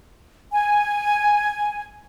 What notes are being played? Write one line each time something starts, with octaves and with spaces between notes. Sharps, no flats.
G#5